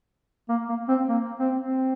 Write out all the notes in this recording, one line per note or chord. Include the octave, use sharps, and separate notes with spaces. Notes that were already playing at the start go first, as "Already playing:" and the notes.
A#3
A#3
C4
A#3
C4
C4